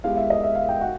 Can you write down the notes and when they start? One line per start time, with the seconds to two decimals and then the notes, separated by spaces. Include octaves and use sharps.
0.04 G#3 B3 E4 G4 F5
0.17 E5
0.30 D#5
0.43 E5
0.55 F5
0.69 G5
0.81 F#4 F#5